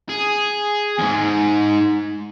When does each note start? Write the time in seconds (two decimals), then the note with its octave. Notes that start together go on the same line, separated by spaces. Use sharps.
0.09 G#4
0.99 E2 G#2